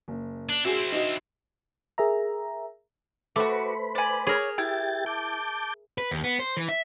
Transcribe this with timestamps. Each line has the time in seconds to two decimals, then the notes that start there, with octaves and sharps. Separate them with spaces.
0.08 F#1
0.49 D4
0.65 C4 E4 F#4 G#4
0.92 D#4 F#4 D#5
1.98 G#4 A#4 E5 A#5
3.36 A3 F#4 B4 C5 B5 D6
3.95 D5 G#5
4.27 G#4 A#4 C#5
4.58 E4 G4 G5 A6
5.06 A5 D6 G6
5.98 B4
6.11 D#2
6.24 B3
6.40 C5
6.57 E3
6.69 E5